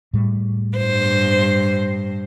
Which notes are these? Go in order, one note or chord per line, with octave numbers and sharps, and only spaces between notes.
A2 G3
G2 C5